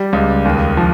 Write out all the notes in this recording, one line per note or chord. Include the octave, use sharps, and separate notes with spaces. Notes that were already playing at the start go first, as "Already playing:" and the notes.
Already playing: G3
C#2
D#2
F3